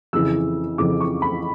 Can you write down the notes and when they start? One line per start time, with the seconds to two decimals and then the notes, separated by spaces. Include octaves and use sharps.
0.13 F2 C#3 E3 E6
0.78 F2 C#3 E3 D6
1.01 C#6
1.22 B5